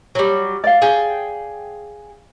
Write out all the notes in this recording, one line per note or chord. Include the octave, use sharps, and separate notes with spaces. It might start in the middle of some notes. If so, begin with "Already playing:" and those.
F#3 G3
D5 F5
G#4 G5